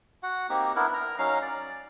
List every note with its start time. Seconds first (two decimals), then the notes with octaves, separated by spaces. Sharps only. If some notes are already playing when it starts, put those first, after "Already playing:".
0.23 F#4 F#5
0.49 A#3 C4 D#4 G4
0.76 B3 D4 E4 A#4
0.93 A#4 A#5
1.19 F#3 C#4 D#4 F5
1.42 D5